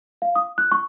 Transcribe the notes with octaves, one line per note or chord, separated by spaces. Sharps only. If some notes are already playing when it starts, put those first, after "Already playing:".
F5
D#6
F#6
C#6